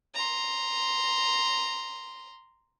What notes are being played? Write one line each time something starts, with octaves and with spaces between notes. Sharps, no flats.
A#5 C6